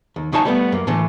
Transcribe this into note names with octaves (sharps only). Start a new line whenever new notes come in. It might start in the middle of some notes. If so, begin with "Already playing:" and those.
D#2
D2 C#3 D#4 C#5 G#5 A5
G3 A3 B3
F#2 A#3
A2 D3 E3 A3